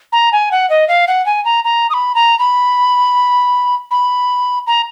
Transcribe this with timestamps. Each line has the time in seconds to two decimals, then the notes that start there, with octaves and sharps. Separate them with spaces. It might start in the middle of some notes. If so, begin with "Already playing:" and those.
0.12 A#5
0.32 G#5
0.51 F#5
0.70 D#5
0.88 F5
1.07 F#5
1.26 G#5
1.45 A#5
1.64 A#5
1.90 D#6
1.94 B5
2.15 A#5
2.39 B5
3.91 B5
4.67 A#5